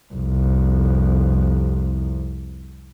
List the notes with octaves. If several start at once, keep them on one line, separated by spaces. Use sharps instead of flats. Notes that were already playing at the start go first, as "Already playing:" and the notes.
C2 F2